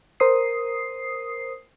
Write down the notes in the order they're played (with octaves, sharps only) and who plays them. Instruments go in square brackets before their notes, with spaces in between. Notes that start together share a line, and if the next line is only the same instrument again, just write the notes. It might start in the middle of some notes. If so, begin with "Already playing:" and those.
[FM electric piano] A#4 C5 D#6 C7